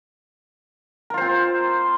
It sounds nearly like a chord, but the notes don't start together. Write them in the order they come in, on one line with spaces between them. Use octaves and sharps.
A#4 F4 C5 C4